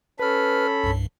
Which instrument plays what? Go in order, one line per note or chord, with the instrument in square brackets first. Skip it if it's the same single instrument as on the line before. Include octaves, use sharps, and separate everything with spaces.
[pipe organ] C#4 A4 B5 [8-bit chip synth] B4 F6
[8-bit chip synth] C2 G2